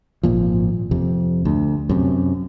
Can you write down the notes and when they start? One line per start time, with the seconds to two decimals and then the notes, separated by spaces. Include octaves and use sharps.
0.23 G#1 A#2 F3
0.91 F2 C3
1.45 D2
1.89 F#2 C3